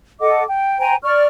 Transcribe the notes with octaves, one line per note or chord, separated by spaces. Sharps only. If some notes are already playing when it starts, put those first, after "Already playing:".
A4 D#5 F#5 D6
G5
C5 G5 G#5 A#5
D5 C#6 F6